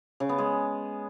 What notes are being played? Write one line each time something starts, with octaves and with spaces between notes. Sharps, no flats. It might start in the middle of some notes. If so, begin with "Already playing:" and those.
C#3
B3
G#3